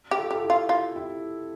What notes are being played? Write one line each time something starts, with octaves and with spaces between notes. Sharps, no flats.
G4
F4 A4
G4
A4
E4 G4
F4
F4
E4 G4